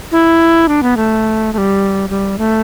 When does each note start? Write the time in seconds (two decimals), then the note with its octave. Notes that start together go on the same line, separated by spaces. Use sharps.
0.12 E4
0.68 D4
0.83 B3
0.97 A3
1.53 A3
1.58 G3
2.09 G3
2.38 A3